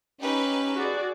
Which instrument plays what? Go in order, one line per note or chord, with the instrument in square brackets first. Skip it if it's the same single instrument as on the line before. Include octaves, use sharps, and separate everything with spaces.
[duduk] C#4 [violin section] D#4 G4 B4
[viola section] F#4 G#4 D5